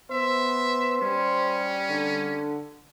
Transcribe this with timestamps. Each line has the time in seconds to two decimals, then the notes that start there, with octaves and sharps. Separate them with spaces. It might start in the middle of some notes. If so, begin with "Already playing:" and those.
0.11 B3 C5 E5
1.02 G3 C#4
1.89 D3